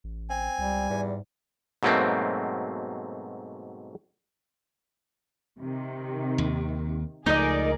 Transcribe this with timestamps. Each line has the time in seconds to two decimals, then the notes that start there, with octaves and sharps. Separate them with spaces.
0.04 A1
0.30 C4 G#5
0.58 C#2 G3
0.90 E2 G#2
1.83 G#2 B2 F#3 A3 A#3 C4
5.60 C3 D#3
6.38 D#2
7.26 C#2 F3 A3 D#4 G#4 A#4 D5 D#5